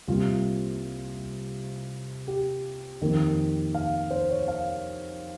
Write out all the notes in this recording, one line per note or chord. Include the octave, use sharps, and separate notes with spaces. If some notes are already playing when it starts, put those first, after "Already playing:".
C2 C3 G3 A#3 F4
G4
F2 D#3 A#3
F5
C5
C#5
F5